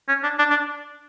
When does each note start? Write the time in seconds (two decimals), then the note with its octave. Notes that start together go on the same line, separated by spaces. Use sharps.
0.08 C#4
0.23 D4
0.39 D4
0.50 D4